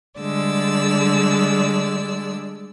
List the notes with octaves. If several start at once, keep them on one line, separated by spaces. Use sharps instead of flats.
D3 G3 G#3 D5 E6